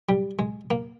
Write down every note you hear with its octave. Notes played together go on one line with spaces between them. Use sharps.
G3
G#3
A#3